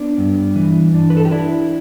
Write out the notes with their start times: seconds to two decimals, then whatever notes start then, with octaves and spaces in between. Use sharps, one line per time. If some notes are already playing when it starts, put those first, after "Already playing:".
Already playing: B3 D4
0.18 G2
0.56 E3
0.94 D4
1.10 B4
1.17 A4
1.25 G4
1.31 D4 E4